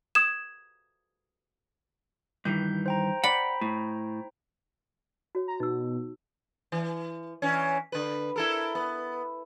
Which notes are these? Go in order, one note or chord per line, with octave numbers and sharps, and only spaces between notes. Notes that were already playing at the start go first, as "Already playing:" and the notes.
D#6 G#6 E7
G2 D#3 E3 G6
C5 G5 A#5
D5 F#5 B5
A2
F#4 C#5
A#5
B2 D#4 E6
E3
E3 C#4
D3 B4
E4 A4 A#4
B3